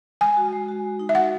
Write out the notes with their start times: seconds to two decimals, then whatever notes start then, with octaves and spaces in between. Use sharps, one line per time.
0.21 G#3 G#5
0.37 F#4
0.53 G#3
0.69 F#4
0.84 G#3
0.99 D#4
1.09 E5
1.15 F#4 F#5